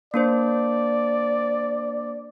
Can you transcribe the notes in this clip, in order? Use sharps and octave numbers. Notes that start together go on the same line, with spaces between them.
A#3 D4 C5 D5